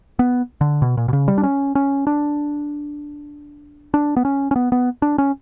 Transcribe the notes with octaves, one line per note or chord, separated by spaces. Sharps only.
B3
D3
B2
A#2
B2
C#3
G3
D4
C#4
C#4
D4
D4
B3
C#4
C#4
B3
B3
D4
C#4